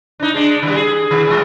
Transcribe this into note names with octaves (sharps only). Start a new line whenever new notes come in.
D4 D#4
G#3 D4
D#3 G3
G#4
D#3
E3 G#3